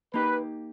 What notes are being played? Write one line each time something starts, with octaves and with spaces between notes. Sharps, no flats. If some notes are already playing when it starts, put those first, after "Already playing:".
A#3 D#4 G4 B4